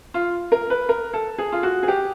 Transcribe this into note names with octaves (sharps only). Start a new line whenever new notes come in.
F4
A#4
B4
A#4
A4
G#4
F4
F#4
G#4
G4